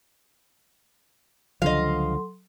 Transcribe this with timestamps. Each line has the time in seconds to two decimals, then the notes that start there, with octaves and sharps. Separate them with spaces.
1.62 C#2 D3 F3 F#3 A4 D#5 F5 C6